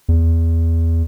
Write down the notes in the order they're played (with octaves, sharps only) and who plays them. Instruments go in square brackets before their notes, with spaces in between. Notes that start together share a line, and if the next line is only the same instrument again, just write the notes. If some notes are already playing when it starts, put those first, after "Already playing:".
[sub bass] E2